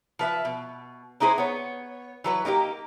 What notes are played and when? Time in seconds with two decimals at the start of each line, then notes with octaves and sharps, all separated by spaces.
0.19 F3 B4 E5
0.45 B2
1.20 A#3 D#4 E4 G#4 B4 C5
1.38 B3 C#5
2.24 E3 F#3 B4
2.45 A#3 D#4 F4 G4